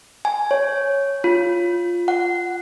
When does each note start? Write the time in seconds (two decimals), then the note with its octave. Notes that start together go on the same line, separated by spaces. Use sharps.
0.25 G#5
0.51 C#5
1.24 F4
2.08 F#5